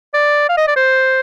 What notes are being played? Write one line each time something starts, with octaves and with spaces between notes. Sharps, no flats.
D5
F5
D#5
D5
C5